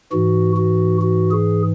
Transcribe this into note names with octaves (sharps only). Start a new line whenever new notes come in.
G#2 E3 F#4
F#4
F#4
G#4